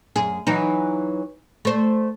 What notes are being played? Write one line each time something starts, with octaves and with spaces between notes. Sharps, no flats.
F#2 G#4
E3 F#3 D#4
A3 C5